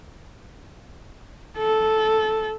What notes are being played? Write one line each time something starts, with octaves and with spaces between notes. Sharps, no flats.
A4